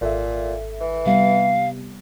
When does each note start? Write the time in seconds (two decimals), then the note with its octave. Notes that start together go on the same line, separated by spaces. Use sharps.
0.01 G#1 A#2 A4 E5
0.81 E3
1.06 C3 G3 B3 F5